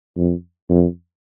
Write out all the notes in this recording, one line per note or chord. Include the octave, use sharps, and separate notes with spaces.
F2
F2